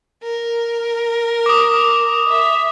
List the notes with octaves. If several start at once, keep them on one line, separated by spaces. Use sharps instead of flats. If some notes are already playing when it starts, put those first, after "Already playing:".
A#4
D6 D#6
E5